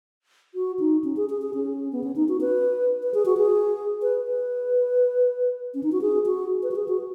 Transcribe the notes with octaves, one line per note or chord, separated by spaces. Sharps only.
F#4
D#4
C#4
G#4
G#4
G#4
C#4
B3
C#4
D#4
F#4
B4
B4
G#4
F#4
G#4
B4
B4
C#4
D#4
F#4
G#4
F#4
B4
F#4
G#4
F#4